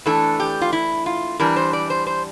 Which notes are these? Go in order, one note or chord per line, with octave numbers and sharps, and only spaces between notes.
E3 A3 D4 A4
G4
F4
E4
F4
E3 G3 D4 A#4
C5
D5
C5
C5